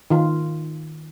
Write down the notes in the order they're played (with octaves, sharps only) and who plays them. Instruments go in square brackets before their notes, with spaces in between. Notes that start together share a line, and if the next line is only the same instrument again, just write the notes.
[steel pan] D#3 F4